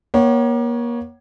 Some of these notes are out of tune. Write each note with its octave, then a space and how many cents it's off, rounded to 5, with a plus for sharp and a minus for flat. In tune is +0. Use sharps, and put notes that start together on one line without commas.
A#3 +35 C#5 +0 F#5 +40